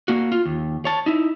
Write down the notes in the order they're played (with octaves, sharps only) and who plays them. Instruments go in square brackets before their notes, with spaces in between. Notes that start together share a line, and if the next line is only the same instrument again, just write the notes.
[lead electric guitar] A#3 F#4
F4
D#2
C#5 A5
D#4 E4